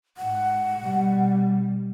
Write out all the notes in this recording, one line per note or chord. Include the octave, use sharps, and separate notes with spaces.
G#2 F#5
B2 G3